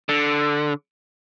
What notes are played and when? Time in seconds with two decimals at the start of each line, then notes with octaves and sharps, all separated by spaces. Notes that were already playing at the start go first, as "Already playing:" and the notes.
0.09 D3